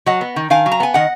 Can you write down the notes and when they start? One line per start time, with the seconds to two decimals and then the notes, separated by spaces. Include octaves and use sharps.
0.06 F#3 D#5 F#5
0.21 B3
0.36 D#3
0.50 D#3 F5 G#5
0.66 F#3
0.72 A#5
0.80 B3 G#5
0.94 D#3 D#5 F#5